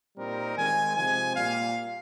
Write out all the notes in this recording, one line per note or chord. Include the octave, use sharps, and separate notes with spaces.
A#2 G3 C4 D#4 A#4
D#3 G#3 C4 G#5
C3 F3 G#3 C4 G#5
A#2 G3 A#3 F5